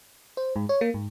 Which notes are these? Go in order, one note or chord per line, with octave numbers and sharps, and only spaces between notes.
C5
G#2
C#5
A#3
G#2